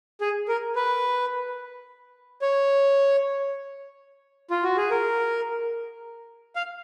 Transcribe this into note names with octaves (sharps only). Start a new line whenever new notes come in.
G#4
A#4
B4
C#5
F4
F#4
G#4
A#4
F5